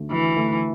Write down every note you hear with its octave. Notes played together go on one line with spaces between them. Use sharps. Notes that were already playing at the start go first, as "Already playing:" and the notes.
Already playing: D2 D3 A3
D2 E3
D3 A3